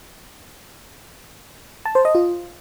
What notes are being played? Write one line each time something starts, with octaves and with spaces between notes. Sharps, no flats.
A5
C5
D#5
F4